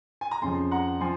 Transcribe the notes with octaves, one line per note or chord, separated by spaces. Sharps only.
G#5
A#5
F2 C#3 F3 G#5 C6
F#5 A#5
F3 G#5 C6